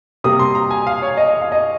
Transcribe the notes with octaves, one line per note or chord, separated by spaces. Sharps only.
C3 G3 A#3 D#6
C6
A#5
G#5
F5
C#5
D#5
D#5
F5
D#5